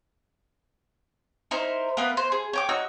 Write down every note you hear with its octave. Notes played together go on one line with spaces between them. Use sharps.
D#4 E4 A#4 C5
A#3 B3 B4
C5
G#4
C#5 G5 D6
D#4 F#4 E6